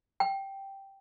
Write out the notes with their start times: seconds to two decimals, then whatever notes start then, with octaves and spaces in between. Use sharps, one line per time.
0.20 G5